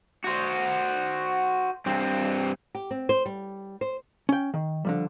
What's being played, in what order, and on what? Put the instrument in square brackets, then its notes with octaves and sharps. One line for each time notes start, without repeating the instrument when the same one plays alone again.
[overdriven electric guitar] F#4 C5
G2 C4
[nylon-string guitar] G4
C4
C5
G3
C5
[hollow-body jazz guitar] C#4 G5
D#3
D3 F3 G3